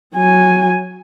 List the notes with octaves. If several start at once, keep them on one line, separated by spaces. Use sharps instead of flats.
F#3 G#5